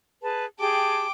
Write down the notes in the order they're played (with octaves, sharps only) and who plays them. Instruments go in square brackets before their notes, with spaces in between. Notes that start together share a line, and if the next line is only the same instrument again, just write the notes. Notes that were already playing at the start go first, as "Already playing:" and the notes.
[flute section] G#4 B4 A5
[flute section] G4 G#4 A5 [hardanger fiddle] G5 D6